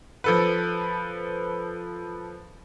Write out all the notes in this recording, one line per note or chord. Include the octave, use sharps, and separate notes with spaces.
F3 A4 B4